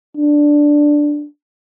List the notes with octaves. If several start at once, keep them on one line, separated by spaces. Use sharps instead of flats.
D4